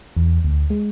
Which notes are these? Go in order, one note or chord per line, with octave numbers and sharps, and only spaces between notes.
E2
D2
G#3